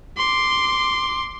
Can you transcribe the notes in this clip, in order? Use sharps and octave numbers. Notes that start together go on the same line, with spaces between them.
C6 D6